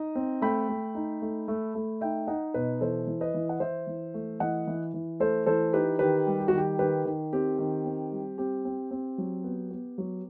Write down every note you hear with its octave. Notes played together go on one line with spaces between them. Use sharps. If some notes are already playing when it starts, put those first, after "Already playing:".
Already playing: D#4 D#5
C4
A3 G5 B5
A3
D#4
A3
A3
A3
D#4 E5 G5
D#4 D#5 F#5
B2 B4 D#5
E3 A4 C5
E3
B4 D#5
E3
F#5
E3 C5 E5
E3
A3
E3 D#5 F#5
E3
E3
A3 A4 C5
E3 A4 C5
D#4 G4 B4
D#3 G4 B4
G3
G4
F#4
D#3 G4
D#3 G4 B4
D#3
C4 G4
D#3
C4
G3
C4 G4
C4
C4
F#3
B3
B3
F#3